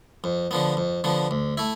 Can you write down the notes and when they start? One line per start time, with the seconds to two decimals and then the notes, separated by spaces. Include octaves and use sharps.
0.24 F2
0.51 D3 F3 B3
0.77 F2
1.04 D3 F3 B3
1.31 D2
1.57 A3 E4